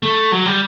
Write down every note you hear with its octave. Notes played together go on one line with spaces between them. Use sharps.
A3
F#3
G3